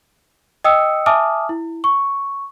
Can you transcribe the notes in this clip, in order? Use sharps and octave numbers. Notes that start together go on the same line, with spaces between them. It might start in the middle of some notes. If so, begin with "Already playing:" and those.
D#5 G5 D#6 E6 C#7
E5 G#5 A5 D6 D#6 F6
E4
C#6